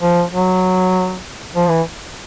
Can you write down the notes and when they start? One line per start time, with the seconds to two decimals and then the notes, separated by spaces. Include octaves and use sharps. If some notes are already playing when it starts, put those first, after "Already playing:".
0.01 F3
0.32 F#3
1.55 F3
1.69 E3